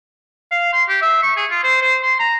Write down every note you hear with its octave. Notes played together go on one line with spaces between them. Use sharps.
F5
C6
G4
E5
C#6
G#4
F4
C5
C5
C6
A#5